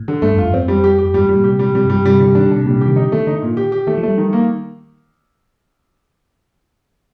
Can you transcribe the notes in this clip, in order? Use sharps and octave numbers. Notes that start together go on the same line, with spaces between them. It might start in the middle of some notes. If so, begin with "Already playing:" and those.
Already playing: A2
D3
G2 A3
F2
G2 F4
F2 C4
G3
G4
G4
F2
G2 G3
A2
G3
A#2
C3 G4
G3
C3 G3
G2
G3
G2
C3 G3
D3 G3
D#3 D4
D3
D4
C3
A#2 G3
C3
D#3 G4
D3 D#4
D#3 A3
D3 D#4
A#2
G4
G4
D#3 A3
F3
G3 A3
D#3
A#3